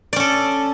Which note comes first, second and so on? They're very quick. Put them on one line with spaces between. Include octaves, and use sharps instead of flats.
D5 C#4 A4